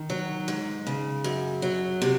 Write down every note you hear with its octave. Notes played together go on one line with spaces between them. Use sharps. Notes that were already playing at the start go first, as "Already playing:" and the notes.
Already playing: D#3
F#3
G#2
C#3
F#2
F#3
C3